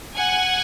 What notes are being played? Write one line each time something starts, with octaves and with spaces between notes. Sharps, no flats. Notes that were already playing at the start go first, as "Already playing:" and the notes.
F#5 G#5